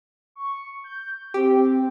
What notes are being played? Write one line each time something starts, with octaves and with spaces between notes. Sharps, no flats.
C#6
G6
C4 G4